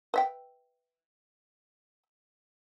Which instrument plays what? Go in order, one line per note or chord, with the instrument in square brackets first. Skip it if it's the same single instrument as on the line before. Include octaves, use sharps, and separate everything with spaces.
[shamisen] B4 E5 G5